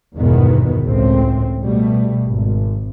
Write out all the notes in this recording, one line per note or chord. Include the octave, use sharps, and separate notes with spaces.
G1 E2 G#2 B2 D#3 B3
G#1 C#2 A2 C4
B2 G3 A3
G#1